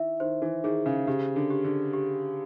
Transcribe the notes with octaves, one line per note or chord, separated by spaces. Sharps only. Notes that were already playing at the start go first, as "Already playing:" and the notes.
Already playing: D#3 E4 E5
D#3 C5
E3
D#3 G#4
C#3
C#3 G4
D3
G4
D3
G4